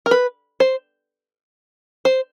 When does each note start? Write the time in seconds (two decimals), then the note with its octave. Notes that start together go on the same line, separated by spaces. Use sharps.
0.06 A#4
0.11 B4
0.60 C5
2.05 C5